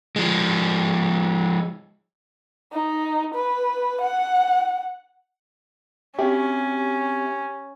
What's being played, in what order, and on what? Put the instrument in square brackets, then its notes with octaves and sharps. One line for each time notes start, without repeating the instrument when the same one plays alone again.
[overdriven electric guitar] F3 G#3
[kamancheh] D#4
B4
F#5
[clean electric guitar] C4 F#4 E5 [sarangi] C#4 [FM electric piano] G4